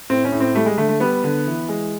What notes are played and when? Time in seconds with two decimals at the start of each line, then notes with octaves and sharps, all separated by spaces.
0.10 A2 C4
0.25 C#4
0.32 A2
0.40 C4
0.54 G3 A3
0.66 G#3
0.77 D3 A3
0.89 A3
1.00 G3 B3
1.24 D3
1.47 E3
1.69 G#3